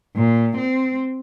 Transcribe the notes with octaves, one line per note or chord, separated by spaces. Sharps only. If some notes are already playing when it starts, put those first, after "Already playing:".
A#2
C4